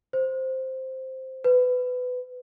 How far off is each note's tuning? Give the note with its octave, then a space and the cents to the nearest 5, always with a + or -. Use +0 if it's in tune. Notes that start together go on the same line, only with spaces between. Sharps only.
C5 +0
B4 +20